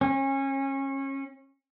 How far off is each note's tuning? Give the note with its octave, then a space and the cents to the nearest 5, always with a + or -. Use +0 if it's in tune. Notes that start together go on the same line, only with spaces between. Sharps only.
C#4 -30